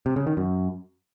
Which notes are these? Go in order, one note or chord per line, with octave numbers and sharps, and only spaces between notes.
C3
C#3
D#3
F#2